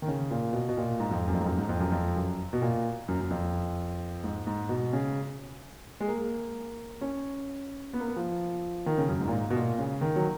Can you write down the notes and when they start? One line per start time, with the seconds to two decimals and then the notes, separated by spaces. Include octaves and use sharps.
0.02 D#3
0.08 C#3
0.30 A#2
0.53 B2
0.69 B2
0.77 A#2
1.00 G#2
1.11 F2
1.27 F#2
1.34 F2
1.40 G#2
1.46 F#2
1.58 G#2
1.69 F2
1.80 F#2
1.92 F2
2.16 F#2
2.53 B2
2.62 A#2
3.08 F#2
3.20 F#2
3.31 F2
4.24 G#2
4.47 G#2
4.69 B2
4.93 C#3
6.00 G#3
6.08 A#3
7.01 C#4
7.93 B3
8.00 A#3
8.08 B3
8.16 F3
8.86 D#3
8.98 C#3
9.09 F#2
9.20 G#2
9.28 A#2
9.32 G#2
9.50 B2
9.56 A#2
9.78 C#3
10.01 D#3
10.16 F#3